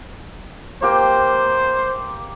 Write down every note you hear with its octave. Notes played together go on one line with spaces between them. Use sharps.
A#3 G4 C5 G5